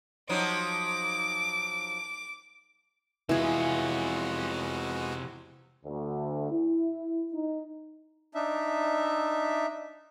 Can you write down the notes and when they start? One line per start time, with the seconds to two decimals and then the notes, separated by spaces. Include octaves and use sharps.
0.29 F3 F#3 D#4 D6
3.29 C3 E3 G#3 B3 F4 F#4 G#4
5.86 D2
6.51 E4
7.33 D#4
8.35 D4 D#4 E5